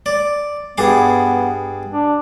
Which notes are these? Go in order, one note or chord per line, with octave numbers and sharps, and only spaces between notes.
D5
G2 B3 G#4 D6
D4